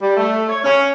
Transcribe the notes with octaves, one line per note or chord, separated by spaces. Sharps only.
G3
A3
C#5
C#4